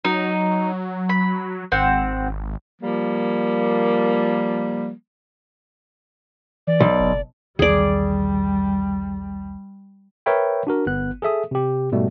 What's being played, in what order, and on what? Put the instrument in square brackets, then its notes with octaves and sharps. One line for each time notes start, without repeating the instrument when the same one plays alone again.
[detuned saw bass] F#3 [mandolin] D#4
[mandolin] B5
[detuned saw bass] G#1 [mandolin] C4 F#5
[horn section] F3 G3 A#3
[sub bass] E3 [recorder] D5
[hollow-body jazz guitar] B1
[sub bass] F#1
[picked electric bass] B1 E2 D#3 [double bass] G3 [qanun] G#4 D5
[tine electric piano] A#4 B4 C#5 E5 G5 B5
D4 F#4 A#4
G1 B3 F#6
G#4 A4 E5 D#6
C3 G4
G#2 B2 G3 A3